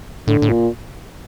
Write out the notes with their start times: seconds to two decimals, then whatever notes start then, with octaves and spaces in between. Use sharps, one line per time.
0.27 A2 D3
0.42 A2
0.49 A#2